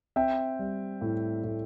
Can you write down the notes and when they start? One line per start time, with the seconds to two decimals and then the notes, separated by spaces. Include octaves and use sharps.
0.16 C4 E5 G5
0.59 G3
1.01 A2
1.44 A2